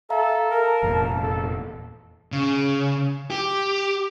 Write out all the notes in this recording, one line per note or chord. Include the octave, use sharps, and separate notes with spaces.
A4 E5 F5 A#5
A#4 A5
F1 E2 A#2
A4
C#3
G4